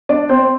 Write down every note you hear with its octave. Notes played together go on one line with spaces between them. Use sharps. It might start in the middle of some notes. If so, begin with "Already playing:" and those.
D4 D5
C4 C5
C5